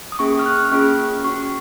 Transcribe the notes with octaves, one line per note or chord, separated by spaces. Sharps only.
D#6
A#3 C#4 G#4 C#6
C#6
F6
F#6
F6
A#3 C#4 F4 G#4 C#6
C#4 F#4 C#6